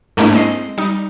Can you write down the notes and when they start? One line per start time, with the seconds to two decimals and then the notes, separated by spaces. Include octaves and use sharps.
0.17 G#2 A3 A#3 C#4 D4 E4
0.33 G#3 C4 D#5 C7
0.78 G3 D#4